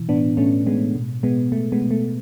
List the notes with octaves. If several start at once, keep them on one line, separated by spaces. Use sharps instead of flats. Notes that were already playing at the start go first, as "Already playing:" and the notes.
Already playing: B2 E3
A2 B3 D4
A2 A3 C#4
A2 G#3 B3
B2
B2 G#3 B3
B2 A3
G#3 B3
B2
A3